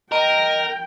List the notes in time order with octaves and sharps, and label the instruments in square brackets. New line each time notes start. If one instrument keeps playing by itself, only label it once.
[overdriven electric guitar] A#4 [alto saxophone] D#5 [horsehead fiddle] G5